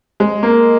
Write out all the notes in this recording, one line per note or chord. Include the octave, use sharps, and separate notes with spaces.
G#3
A#3